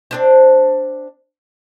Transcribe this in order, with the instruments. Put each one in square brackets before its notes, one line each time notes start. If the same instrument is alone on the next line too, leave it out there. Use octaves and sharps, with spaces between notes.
[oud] C4 D4 C5